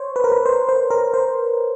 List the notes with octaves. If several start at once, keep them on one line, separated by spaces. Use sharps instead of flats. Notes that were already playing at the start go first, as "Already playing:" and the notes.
Already playing: C5 C#5
B4
A#4
B4
C5
C5
A#4
C5